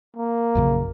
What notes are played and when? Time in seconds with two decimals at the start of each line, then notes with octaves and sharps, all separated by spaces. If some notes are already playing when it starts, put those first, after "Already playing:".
0.16 A#3
0.55 A#1 F#2 C#3